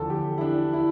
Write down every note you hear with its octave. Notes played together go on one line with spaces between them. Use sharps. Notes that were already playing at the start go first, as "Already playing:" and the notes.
Already playing: E2 D3 F3 A4
G4
E4
D4
E4